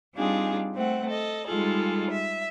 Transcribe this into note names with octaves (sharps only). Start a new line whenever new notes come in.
G3 C4 D4 D#4 F4 G#4
A3 C4 F#5
A4 D#5
G3 G#3 D#4 F4 G#4 A4
E5